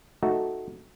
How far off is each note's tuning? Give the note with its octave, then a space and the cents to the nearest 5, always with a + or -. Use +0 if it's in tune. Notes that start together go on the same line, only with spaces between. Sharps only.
A3 -5 D#4 +0 F#4 +0